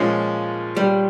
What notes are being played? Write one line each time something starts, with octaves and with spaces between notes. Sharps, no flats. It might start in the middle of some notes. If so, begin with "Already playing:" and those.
Already playing: A#2 F3 G#3 C#4
G3